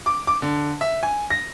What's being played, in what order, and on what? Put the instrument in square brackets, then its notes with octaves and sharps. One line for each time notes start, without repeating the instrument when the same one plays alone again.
[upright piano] D6
D6
D3
E5
G#5
A#6